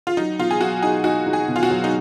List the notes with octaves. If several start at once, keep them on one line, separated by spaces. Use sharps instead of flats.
F4
F#3 D#4
B2 F4
G#4
F#3 F#4
D#4 G#4
D#4 F#4
D#4
G#4
B2
F4
F#4
F#3
D#4